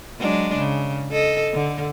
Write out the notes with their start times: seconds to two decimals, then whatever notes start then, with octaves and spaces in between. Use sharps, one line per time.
0.20 F#3 G#3 D4
0.57 C#3
1.11 A4 D#5
1.54 D3